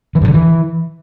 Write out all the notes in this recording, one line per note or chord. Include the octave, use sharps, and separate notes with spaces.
E3
G2
D3
E3